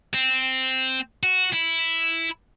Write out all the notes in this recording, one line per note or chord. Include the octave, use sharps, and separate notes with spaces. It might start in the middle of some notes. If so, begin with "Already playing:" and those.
C4
F#4
E4